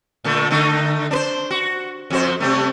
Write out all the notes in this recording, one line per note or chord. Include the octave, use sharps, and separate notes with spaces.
A#2 D3 A3
D3 A3 D#4
D4 B4 C5
F#4
F2 F#4 C5
C3 G3 A3